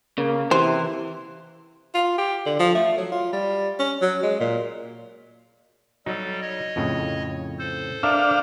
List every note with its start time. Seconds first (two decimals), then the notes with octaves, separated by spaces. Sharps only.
0.18 C#3 A#3
0.51 C3 E3 C5
1.95 F4
2.18 G4
2.46 D3
2.59 F3
2.75 A3
2.98 F#3
3.12 F4
3.33 G3
3.79 C#4
4.01 F#3
4.23 G#3
4.40 A#2
6.06 F#3 G3 D#4 A4
6.41 C#5 D#5
6.76 F2 A2 C#3
7.59 A4 C5
8.03 D4 A#4 E5 F5 A5